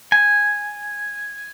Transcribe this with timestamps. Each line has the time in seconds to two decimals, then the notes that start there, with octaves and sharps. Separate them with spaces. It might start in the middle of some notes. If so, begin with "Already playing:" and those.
0.12 G#5